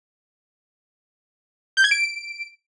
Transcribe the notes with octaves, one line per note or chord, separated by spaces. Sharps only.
G6
G#6
D7